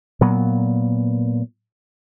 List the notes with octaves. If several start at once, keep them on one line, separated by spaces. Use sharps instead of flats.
A#2 F#3 B3